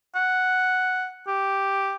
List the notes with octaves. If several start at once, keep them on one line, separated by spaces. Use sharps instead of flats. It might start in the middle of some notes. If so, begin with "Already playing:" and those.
F#5
G4